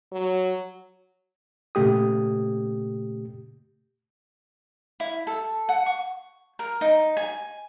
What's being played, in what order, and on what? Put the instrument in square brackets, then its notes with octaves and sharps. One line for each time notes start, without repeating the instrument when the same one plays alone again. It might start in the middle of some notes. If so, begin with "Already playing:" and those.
[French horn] F#3
[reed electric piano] A#2 C#3 A3 G4 D#6
[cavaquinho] E4
A4
F#5
C#6
A#4
D#4
G#5